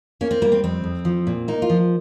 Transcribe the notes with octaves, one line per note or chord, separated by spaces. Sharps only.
A#3 C#4
C4
G3 A#3
C4
F2 C4
F2
F3
A#2
A#3 D#4
F4
F3